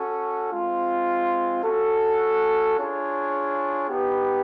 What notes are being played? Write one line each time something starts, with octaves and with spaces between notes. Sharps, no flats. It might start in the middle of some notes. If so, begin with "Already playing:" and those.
Already playing: C#4 F#4 A4
G#3 C4 F4
C#4 F#4 A4
D4 F4 G#4 C#5
B3 D#4 G4 B4